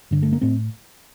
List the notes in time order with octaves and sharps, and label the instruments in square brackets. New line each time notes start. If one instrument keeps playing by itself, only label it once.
[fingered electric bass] G2 D3
A3
A#3
A2 C4